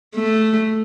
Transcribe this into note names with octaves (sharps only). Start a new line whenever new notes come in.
A3